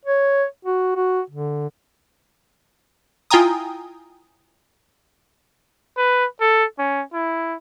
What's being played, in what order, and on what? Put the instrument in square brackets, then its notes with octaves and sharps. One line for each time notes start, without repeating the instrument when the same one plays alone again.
[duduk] C#5
F#4
F#4
D3
[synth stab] E4 F4 G5 G#5 A#5 D#6
[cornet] B4
A4
C#4
E4